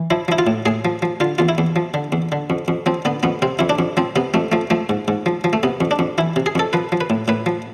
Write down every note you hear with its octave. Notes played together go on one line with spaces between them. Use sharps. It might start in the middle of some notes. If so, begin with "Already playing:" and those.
Already playing: E3
F3 E4
F3 E4
F4
A2
A2 G#4
F3
F3
D3 F4
E2 F4
E4
E2
F3
D3
E2
D3
F2
F2
F3 C4
D3 B3
F2 B3
C3 C4
F2 E4
D4
F2
F3 C4
C3 B3
F2 A3
F3 A3
F3 A3
G#2
G#2
F3
F3
A3
C3 B3
F2
D4
F2
E3 E4
C3
G#4
F2 A4
F3 B4
F3
B4
A2
A2 B4
F3